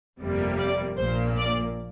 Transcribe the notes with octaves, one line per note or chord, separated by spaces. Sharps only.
G1 F2 C3 G3 A#3
D5
A#1 A#2 A#3 C5
D5